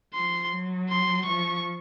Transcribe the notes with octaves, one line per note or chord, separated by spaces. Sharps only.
F3 C6
F#3
C6
F3 C#6